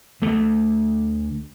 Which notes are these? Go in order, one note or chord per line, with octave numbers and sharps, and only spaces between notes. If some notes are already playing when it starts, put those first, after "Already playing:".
D2 A3